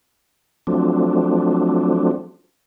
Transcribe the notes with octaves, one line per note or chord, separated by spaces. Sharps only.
F3 F#3 A3 C4 D4